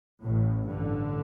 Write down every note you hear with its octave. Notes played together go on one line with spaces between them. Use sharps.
A1 A2
A1 G2 D3